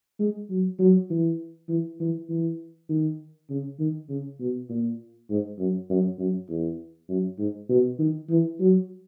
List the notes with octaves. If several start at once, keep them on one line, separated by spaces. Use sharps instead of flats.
G#3
F#3
F#3
E3
E3
E3
E3
D#3
C#3
D#3
C#3
B2
A#2
G#2
F#2
F#2
F#2
E2
F#2
G#2
B2
D#3
E3
F#3